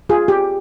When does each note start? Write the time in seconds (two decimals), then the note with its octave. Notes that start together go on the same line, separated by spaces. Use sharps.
0.09 F4 G#4
0.28 G4